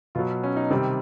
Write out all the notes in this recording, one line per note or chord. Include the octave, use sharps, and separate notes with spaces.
B2 F#3 F4
C#4
D#4
C3 D#3 G3 C4